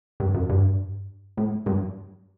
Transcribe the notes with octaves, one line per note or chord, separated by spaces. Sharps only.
G2
F#2
G2
A2
G2